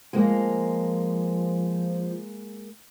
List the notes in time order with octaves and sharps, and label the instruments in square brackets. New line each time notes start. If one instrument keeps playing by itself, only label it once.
[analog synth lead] F3 [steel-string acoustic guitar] G#3 A#3